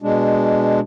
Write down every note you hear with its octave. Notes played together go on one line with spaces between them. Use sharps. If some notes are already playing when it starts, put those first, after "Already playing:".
B2 G#3 D4